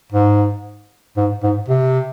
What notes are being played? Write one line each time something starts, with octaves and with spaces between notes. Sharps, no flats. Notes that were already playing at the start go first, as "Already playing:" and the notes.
G#2
G#2
G#2
C3